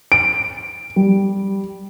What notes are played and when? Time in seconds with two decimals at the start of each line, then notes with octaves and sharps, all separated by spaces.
0.12 D7
0.96 G3